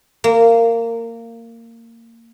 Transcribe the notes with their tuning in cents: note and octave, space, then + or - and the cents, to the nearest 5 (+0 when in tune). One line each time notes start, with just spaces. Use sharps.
A#3 -20